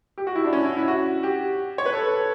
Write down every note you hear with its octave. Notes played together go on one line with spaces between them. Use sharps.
G4
F#4
E4
D4
C#4
E4
E4
F#4
G4
C#5
B4
A4